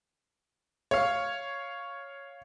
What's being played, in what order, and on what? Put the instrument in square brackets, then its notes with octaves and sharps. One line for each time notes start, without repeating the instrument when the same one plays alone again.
[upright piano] C#5 F5